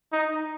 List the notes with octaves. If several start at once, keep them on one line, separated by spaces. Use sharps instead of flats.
D#4